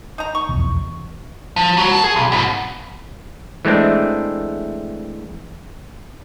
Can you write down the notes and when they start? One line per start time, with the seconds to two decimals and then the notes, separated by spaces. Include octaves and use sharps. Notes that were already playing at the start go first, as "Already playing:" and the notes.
0.18 D#4 A#5
0.35 C#6
0.49 F1 B1 E2
1.56 F3
1.77 F#3 F#4
1.92 A#4 A5
2.04 G#4
2.16 B1
2.32 G#2 B2
3.65 E3 G#3 A3 C4 D4